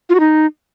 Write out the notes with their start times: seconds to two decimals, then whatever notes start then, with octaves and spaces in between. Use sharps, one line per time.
0.09 F4
0.15 F#4
0.20 D#4